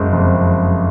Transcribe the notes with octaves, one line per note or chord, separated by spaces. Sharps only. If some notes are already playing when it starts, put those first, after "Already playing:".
Already playing: F#1 G#3
F2